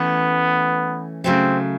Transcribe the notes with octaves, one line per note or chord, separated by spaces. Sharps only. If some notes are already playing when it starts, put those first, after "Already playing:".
Already playing: E3 A3 B3 C#4
C#3 F#3 A3 C4